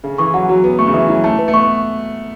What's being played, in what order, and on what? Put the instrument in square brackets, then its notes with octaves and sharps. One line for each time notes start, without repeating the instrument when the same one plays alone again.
[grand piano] C#3 [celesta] A4
[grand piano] E3 [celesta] C#6
[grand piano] F#3 [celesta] F#5
[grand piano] F#3 [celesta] F#4
[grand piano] B3 [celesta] B4
[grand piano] A3 [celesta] C#6
[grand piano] C#3
[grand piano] E3 [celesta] E5
[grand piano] F#3 [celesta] E4
[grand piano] A3 [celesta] A5
[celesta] B4
[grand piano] A3
[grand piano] B3 [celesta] C#6